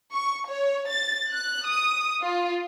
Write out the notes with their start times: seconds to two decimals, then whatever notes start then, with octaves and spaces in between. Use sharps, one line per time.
0.12 C#6
0.46 C#5
0.88 A6
1.31 F#6
1.65 D#6
2.23 F4